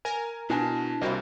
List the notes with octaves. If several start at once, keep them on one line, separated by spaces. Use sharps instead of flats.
A#4 G#5
B2 D4 E4 G#5 A5
C2 A#3 C4 E4 F#4 D#5